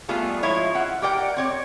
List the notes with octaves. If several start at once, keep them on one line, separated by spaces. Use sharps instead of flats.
G3 A3 B3 F4 G#4 A5
F3 G#3 E4 F4 C#5
F4 E5 F#5
G4 A#4 D5 F#5 G5
C4 C#5 D5